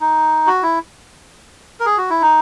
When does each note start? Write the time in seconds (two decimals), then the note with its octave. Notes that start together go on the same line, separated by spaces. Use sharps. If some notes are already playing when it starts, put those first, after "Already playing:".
0.01 D#4
0.47 F#4
0.63 E4
1.80 A#4
1.86 G#4
1.98 F#4
2.10 E4
2.22 D#4